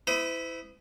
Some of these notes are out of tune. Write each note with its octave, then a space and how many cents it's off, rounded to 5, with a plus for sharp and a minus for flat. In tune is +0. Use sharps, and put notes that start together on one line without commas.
E4 -10 C5 -45 D#6 +0